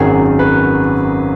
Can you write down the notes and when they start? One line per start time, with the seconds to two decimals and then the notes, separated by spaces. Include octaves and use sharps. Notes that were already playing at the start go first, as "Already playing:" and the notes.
Already playing: G#1 F#2 D#3 F#3 G#4
0.39 B4